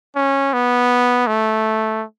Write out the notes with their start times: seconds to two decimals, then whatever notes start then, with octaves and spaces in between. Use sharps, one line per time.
0.16 C#4
0.53 B3
1.27 A3